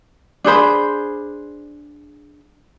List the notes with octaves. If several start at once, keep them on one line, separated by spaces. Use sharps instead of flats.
D4 G#4 C5 B5